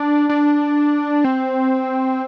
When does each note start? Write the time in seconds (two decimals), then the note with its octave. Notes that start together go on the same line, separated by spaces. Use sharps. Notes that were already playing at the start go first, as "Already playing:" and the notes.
Already playing: D4
0.29 D4
1.24 C4